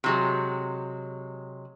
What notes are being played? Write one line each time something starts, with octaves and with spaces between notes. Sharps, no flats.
C3 F#3 G#3